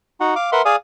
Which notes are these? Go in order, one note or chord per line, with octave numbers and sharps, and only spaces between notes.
D#4 F#4 F#5
F5 D6
A#4 B4 E5 F#5 C6
G#4 D5 F5 G#5 D#6